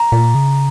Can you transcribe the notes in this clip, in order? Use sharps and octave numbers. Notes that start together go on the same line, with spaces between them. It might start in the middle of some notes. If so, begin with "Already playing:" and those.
Already playing: A#5
A#2
C#3